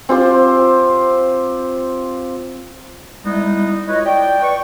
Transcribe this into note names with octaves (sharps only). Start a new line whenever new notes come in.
C4 F4 G4 C5
G3 G#3 B3 D#4 E4
E4 F4 B4 C#5 D#5
D5 G5
B4 D5 C#6